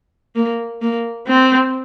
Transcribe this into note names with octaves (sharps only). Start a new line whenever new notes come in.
A#3
A#3
C4